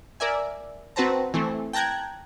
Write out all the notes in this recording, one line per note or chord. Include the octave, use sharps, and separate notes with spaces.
A#4 D5 E5 G#5
C4 F#4 B4 C5 A5 A#5
E3 A3 C4
G5 A5 A#5 F#6 G#6